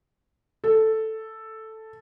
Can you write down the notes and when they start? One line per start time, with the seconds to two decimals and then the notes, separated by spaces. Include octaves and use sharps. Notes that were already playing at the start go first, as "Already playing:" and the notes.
0.64 A4